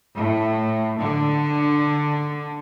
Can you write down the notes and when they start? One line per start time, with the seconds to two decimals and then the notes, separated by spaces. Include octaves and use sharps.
0.16 A2
0.99 D3